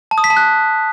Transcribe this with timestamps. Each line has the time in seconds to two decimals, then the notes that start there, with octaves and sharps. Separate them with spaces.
0.11 A5
0.18 D#6
0.24 B6
0.30 A5
0.37 F#6